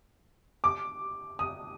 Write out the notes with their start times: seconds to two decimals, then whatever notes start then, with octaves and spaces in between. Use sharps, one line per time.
0.64 D6
1.39 D#6